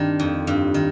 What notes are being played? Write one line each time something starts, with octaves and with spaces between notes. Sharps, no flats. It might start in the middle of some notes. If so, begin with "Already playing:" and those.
Already playing: G2 D#3 C4 D4
F2
G2
D#3